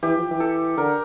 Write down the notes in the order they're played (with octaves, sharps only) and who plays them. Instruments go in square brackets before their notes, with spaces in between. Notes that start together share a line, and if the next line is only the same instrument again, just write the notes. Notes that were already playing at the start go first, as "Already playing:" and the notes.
[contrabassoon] E3 [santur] G4
[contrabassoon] F3
E3
[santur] A4
[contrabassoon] D3 [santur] A#4